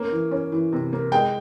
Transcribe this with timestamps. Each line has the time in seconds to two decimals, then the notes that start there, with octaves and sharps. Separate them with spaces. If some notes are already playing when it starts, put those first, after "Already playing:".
Already playing: A#3 C#4
0.12 E3
0.31 C#4
0.52 E3
0.73 C3
0.93 A#3
1.12 G#3 G5